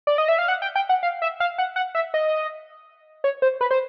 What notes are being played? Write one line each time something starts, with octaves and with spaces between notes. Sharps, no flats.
D5
D#5
E5
F5
F#5
G5
G5
F#5
F5
E5
F5
F#5
F#5
E5
D#5
C#5
C5
B4
C5